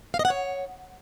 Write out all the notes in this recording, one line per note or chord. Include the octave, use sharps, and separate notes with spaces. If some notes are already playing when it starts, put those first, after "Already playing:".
F5
D#5
F#5
C#5